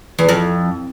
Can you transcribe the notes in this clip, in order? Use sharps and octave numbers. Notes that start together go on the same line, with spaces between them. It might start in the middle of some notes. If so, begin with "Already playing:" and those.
E2
F2